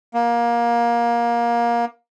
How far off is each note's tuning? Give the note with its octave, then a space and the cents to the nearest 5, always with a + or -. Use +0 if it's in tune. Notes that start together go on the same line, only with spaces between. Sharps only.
A#3 +20